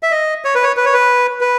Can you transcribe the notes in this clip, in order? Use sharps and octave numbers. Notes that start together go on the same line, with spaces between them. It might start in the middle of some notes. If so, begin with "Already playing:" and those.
E5
D#5
C#5
B4
C#5
B4
C#5
B4
B4